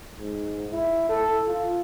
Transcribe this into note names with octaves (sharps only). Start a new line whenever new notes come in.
G#2
E4
A4
F4